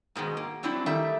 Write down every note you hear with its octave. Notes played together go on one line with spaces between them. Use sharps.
G#2 B2 D#3 G#3
A#3
F#3 G3 C4 D4 E4
D#3 G3 A3 E5